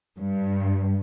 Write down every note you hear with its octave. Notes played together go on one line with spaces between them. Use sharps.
G2